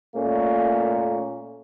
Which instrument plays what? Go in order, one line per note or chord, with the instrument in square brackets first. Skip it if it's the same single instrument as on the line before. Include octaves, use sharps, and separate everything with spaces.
[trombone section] A#2 A3 A#3 C#4